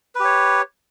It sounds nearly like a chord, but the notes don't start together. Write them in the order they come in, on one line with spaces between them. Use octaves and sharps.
B4 G4 C#5